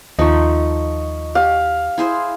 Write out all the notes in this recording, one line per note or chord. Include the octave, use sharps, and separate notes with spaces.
D#2 F3 A3 D#4 D#5 C#6
G4 F5
E4 G#4 C5